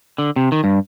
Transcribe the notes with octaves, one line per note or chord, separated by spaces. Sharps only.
D3
C3
D#3
G2